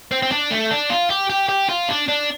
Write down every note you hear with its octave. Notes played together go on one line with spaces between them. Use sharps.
C4
C4
D4
A3
D4
F4
G4
G4
G4
F4
D4
D4